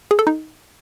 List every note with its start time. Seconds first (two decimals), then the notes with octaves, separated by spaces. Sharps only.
0.11 G#4
0.19 A4
0.27 D#4